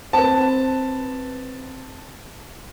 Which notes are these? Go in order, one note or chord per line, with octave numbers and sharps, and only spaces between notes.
C4 B4 A5